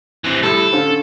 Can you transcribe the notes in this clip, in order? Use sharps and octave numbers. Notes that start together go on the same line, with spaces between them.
C3 E3
A2 G3 A4
D3 C#4 F4